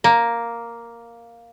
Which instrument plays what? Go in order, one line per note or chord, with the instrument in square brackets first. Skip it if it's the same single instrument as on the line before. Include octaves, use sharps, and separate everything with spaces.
[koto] A#3